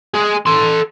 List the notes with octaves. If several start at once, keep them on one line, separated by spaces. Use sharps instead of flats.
G#3 G#4
A4 C6